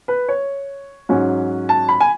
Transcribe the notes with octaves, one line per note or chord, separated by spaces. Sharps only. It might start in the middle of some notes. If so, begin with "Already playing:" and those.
B4
C#5
G#2 F#3 C#4
A5
B5
G#5